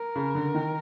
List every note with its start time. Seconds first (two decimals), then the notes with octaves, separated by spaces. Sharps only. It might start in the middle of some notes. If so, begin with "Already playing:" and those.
Already playing: A#4
0.16 C#3
0.35 D3
0.54 D#3